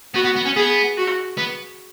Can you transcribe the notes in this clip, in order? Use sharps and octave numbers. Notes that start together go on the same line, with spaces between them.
B3 F#4
B3
B3
C#4
B3 G#4
F#4
B3